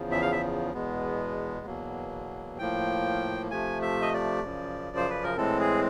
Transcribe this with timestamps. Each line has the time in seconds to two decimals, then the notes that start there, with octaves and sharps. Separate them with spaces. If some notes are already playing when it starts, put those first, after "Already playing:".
Already playing: E2 C#3 F3
0.11 E5
0.22 F5
0.32 E5
0.74 E2 B2 G#3 B3
1.66 E2 B2 F#3 A#3
2.59 A2 F3 A#3 G5
3.51 C3 F3 A3 G#5
3.82 E5
4.02 D#5
4.14 D5
4.44 F#2 C#3 F3
4.96 C5
5.10 B4
5.24 A#4
5.37 A2 E3 G#3 C4 A4
5.60 G#4